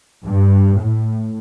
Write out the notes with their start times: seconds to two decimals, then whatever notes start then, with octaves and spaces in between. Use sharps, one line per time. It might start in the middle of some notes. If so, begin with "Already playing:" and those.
0.25 G2
0.80 A2